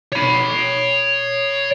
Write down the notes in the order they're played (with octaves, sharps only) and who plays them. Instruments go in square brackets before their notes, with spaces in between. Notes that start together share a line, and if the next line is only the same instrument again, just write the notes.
[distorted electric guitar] C#5 B5